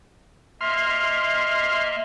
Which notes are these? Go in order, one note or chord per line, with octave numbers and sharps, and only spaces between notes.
A#3 D#5 E5 C6 F6